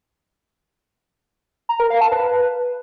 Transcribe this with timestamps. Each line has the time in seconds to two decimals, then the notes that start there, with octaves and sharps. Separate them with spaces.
1.69 A#5
1.80 A#4
1.90 F5
2.01 A5
2.12 B4